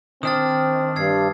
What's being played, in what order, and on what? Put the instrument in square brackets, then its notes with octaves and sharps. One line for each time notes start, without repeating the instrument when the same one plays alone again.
[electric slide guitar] D#3 D4 [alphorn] C4 [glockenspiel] D#6 F6 A6
[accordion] G2 [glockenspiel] E6 G#6 C7